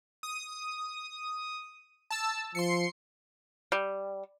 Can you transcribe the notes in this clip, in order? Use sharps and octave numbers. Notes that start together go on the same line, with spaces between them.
D#6
A5 E6
F3 C6 C7 C#7
G3